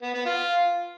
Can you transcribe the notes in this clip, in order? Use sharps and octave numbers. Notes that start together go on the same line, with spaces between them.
B3
B3
F4